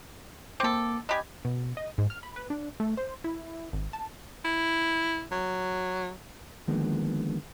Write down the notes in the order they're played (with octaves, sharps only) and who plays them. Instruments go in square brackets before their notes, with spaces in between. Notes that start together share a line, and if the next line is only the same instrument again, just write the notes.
[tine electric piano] A#3 D6 [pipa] C4 A4
[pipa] D4 G4 G#5 [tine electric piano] D#5 B5
[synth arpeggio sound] B2
D#5
G#2
F6
B5
B4
D4
A3
C5
E4
G#1
A5
[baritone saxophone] E4
F#3
[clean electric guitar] D3 D#3 F3 G#3 A#3 B3